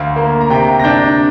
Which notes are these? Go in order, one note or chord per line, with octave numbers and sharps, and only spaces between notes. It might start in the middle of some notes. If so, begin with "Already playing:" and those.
Already playing: D2 F5
A#3
A#5
C3 G5
A#6
D4 G6